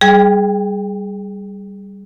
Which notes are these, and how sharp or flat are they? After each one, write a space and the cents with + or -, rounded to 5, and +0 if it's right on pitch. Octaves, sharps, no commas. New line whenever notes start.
G3 +0 G#4 +10 G5 +35